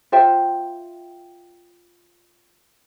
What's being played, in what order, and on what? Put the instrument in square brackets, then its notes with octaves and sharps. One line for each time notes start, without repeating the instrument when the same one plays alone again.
[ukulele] F4 C5 E5 G5